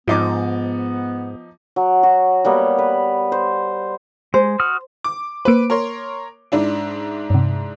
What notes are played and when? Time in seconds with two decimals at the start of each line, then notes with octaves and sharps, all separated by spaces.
0.08 G#2 F3 B3 D#4 D6
1.76 F#3
2.03 F#4
2.45 G3 A#3 B3 C#5
2.79 B4
3.32 C5
4.34 G#3 C5
4.60 F#4 D#6 F6
5.04 D6
5.45 A#3 B4 C5 D7
5.70 A#4 C#5 C6
6.52 G#2 D4 E4
7.30 G2 C3